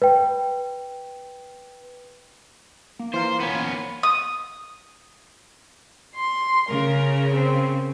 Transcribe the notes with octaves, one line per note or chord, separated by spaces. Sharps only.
B4 G5
A#3
E3 F4 A#4 C5
B3 C#4
D#6
C6
C#3 A#4
C4